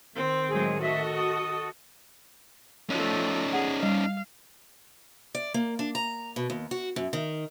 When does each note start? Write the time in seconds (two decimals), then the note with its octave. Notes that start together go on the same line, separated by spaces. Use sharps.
0.16 D#3 C4
0.49 A2 F#3 G#3 G#4
0.82 F#4 A4 D#5 E5
1.15 D#6
2.90 F3 A3 C#4 D#4
3.53 G#4 F#5
3.83 G3 F5
5.35 D5
5.54 A#3
5.79 D4
5.95 A#5
6.36 B2
6.50 D#2
6.71 F#4
6.96 F#2
7.13 D#3